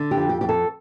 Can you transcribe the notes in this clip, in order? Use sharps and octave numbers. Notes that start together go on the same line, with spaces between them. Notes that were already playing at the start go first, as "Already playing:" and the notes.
Already playing: D3
G4
F2
G4
F2 G4
A4